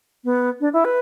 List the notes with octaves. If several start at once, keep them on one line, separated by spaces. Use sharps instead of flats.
B3
D4
E4
B4